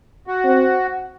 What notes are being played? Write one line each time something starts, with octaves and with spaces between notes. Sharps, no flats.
F#4
C4